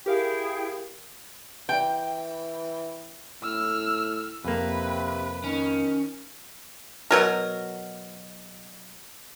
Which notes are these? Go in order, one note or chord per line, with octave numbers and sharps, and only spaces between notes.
E4 G4 G#4 A#4 F5 G5
E3 G5
A2 E6 F6
F2 C3 A#3 B4
D#3 C#4
B2 F#3 A#4